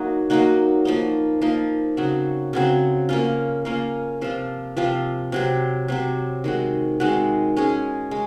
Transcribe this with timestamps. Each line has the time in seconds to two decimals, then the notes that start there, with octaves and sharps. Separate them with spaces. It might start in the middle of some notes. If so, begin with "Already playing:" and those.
Already playing: F#3 A#3 D#4 F#4
0.30 F#3 A#3 D#4 F#4
0.85 F3 A#3 D#4
1.41 F3 A#3 D#4
1.97 C#3 F#3 C4 F#4
2.53 C#3 F#3 C4 F#4
3.09 A#3 C#4 F4
3.65 A#3 C#4 F4
4.21 C3 F3 C4 F4
4.77 C3 F3 C4 F4
5.32 C3 F#3 C4
5.88 C3 F#3 C4
6.44 D#3 G#3 C4 F#4
7.00 D#3 G#3 C4 F#4
7.57 G#3 C#4 G#4
8.11 G#3